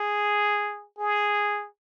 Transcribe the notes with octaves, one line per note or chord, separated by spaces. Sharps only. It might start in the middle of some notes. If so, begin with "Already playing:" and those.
Already playing: G#4
G#4